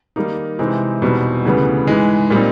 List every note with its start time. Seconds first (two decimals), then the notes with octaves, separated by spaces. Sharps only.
0.16 D#3 G3 A#3 D#4
0.59 C3 E3 G#3 C4 D#4
1.02 E2 B2 G3 C4 D#4
1.45 D2 C#3 E3 G3 B3
1.87 G#2 E3 G#3
2.30 A#2 G3 C4 D#4